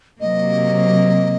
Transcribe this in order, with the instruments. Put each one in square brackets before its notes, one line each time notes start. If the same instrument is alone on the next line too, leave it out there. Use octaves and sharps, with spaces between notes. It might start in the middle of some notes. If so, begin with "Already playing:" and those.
[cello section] C3 F#3 A#3 [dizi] D#5